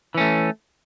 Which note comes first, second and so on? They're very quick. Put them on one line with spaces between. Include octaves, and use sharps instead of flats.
E3 C#4 A3